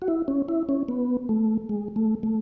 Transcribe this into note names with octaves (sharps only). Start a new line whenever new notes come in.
F#4
E4
C#4
E4
C#4
B3
A3
G#3
A3
A3